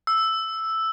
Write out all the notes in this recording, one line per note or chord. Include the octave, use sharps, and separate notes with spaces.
E6